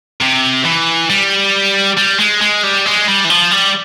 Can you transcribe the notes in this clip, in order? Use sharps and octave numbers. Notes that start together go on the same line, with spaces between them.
C3
E3
G3
G3
G#3
G#3
G3
G#3
G3
E3
F3
G3